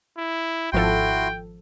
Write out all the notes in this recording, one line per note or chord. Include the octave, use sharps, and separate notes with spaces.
E4
G#1 F3 E4 F#4 A4 G5 C6